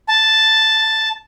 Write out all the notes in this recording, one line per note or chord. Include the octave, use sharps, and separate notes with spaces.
A5